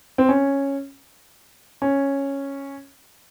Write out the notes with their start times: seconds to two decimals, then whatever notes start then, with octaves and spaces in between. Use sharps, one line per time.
0.18 C4
0.29 C#4
1.82 C#4